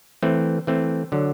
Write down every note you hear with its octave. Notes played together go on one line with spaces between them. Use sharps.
E3 A3 C4
E3 A3 C4
D3 F#3